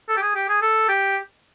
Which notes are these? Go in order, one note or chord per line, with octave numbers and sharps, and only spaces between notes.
A4
G4
G#4
G4
G#4
A4
G4